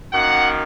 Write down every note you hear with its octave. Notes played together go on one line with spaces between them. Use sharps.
F#2 D#3 A#3 F#5